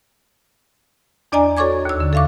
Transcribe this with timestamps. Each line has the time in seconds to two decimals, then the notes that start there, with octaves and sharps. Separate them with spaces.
1.32 E2 D4 D5 D#5 G#5 A#5
1.57 F#4 A4 C#5 C#6 D6 G#6
1.85 D#2 E6
2.00 D3
2.13 A4 E5 F5 C#6 D6